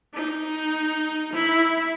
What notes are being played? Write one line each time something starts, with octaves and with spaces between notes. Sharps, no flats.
D#4
E4